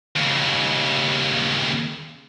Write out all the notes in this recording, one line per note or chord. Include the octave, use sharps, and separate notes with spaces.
D#2 C#3